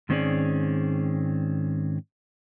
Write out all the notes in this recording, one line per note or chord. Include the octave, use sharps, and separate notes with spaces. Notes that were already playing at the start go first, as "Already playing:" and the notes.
G#2 D#3 C4 C#4 G#4 D5